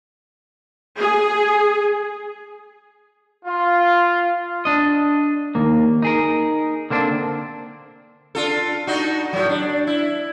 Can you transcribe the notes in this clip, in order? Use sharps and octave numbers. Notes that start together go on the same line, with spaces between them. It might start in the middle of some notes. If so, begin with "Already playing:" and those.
G#4
F4
D4 D#5
D#2 A#3
D#4 G#4 A#4
D3 A#3 C4 D4
D4 F4 A4
D4 D#4 F#4
A2 F#3
D4
E4